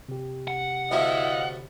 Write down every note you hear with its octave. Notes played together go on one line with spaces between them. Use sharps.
C3 G4
F#5
D2 A2 A3 E4 D#5 F5